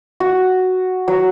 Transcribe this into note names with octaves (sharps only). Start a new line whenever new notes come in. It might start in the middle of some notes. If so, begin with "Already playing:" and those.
F#4
F#3